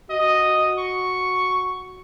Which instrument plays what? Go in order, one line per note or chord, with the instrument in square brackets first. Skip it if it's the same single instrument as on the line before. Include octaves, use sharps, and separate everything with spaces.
[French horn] F#4 [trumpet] D#5
[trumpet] C#6